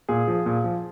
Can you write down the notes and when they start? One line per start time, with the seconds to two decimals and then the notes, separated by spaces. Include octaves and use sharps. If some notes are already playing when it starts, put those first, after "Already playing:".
0.09 A#2 G#4
0.28 F3
0.46 A#2
0.64 F3